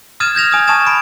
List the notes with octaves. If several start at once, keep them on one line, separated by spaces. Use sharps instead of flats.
D#6 F6 G#6 A6 D#7 E7
G6 G#6 A#6 F7
G#5 D#6 F6
G#5 A5 C#6 D#6 A6 E7
B5 D7